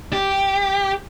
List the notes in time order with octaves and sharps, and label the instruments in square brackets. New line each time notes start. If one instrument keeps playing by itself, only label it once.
[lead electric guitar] G4